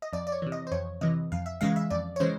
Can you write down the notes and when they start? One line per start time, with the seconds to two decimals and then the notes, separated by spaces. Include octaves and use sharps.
0.02 D#5
0.13 F2 D5
0.27 D5
0.32 C#5
0.42 C3 E3
0.52 D#5
0.67 C5
0.71 F2 C#5
1.01 C3 E3 D#5
1.32 F2 F5
1.46 E5
1.61 C#3 E3 G#3 F5
1.76 E5
1.90 F2 D5
2.16 C#5
2.20 C#3 E3 G#3 C5